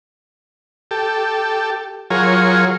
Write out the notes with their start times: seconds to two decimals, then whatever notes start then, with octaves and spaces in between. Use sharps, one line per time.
0.91 G4 A4
2.10 F#3 F4 G#4 A#4 C#5